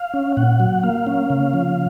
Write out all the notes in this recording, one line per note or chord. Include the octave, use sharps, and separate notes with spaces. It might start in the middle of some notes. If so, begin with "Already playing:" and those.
Already playing: F5
C#4
A#2 F#5
F#3
A#3 F5
C#4
C#3
F3